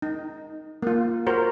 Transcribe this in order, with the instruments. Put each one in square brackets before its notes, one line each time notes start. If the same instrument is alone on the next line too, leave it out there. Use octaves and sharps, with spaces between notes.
[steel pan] D#4
A#3 F4
F#4 A#4 C5